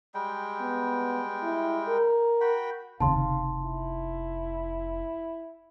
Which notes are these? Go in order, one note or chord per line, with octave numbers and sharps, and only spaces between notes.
G3 G#3 G5
B3
E4
A#4
F#4 G5 B5
F1 D#2 C#3 D#4 F5 A5 C6
E4